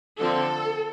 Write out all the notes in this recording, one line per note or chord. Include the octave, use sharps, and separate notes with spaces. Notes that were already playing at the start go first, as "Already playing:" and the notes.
D3 F3 C4 A4